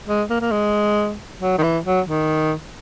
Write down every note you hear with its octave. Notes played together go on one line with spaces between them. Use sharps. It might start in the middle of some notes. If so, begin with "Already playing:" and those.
G#3
A#3
A#3
G#3
F#3
D#3
E3
F#3
D#3